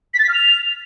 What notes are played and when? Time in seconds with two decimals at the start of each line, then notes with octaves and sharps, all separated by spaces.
0.14 B6
0.19 A6
0.24 B6
0.29 F6
0.34 F7